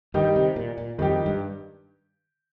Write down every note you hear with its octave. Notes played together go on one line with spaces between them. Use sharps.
G2 D#3 G3 D#4 G4
C3
A#2
A#2
F2 D#3 G3 D#4 G4
G2